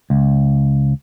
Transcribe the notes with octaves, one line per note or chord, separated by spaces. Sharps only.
C#2